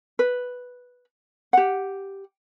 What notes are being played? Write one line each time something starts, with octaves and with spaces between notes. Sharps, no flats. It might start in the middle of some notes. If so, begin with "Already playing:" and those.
B4
G4 F#5